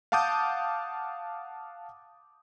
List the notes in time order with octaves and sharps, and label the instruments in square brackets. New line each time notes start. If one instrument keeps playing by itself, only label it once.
[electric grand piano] F5 F#5 A5 D6 D#6 G6